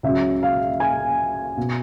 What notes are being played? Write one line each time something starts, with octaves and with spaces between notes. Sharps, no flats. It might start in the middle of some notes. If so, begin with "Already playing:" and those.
C#2 C#3 F#3 E5
F5
G#5
B2